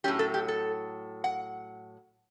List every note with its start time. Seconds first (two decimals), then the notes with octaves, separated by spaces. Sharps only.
0.04 A2 F#3 C#4 G4
0.19 A4
0.34 G4
0.48 A4
1.24 F#5